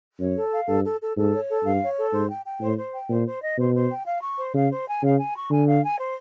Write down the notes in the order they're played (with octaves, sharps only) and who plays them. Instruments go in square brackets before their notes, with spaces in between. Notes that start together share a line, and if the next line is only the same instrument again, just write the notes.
[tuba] F#2 [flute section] C#5
[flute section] A4
F5
[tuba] G2 [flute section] A4
[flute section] A4
A4
[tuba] G#2 [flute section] A4
[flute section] C#5
A4
[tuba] G2 [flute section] F5
[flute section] C#5
A4
[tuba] G#2 [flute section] C5
[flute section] G5
G5
[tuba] A2 [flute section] C5
[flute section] C5
G5
[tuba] A#2 [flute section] C5
[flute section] C5
D#5
[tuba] B2 [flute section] C5
[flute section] C5
G5
F5
C#6
C5
[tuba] C#3 [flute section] F5
[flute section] C5
G#5
[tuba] C#3 [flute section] F5
[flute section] G#5
C#6
[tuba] D3 [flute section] G#5
[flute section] F5
G#5
C5